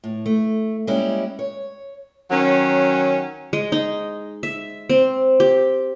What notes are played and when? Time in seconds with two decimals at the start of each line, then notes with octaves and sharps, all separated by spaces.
0.04 A2
0.26 A3
0.87 G3 G#3 A#3 C#4 E4 G4
1.39 C#5
2.31 D#3 F#3 C#4
3.53 G#3
3.72 D#4
4.43 E5
4.89 C4
5.40 G4